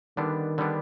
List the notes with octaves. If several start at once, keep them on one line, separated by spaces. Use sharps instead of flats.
D3 D#3 G3 B3 D4
D3 G3 B3 D4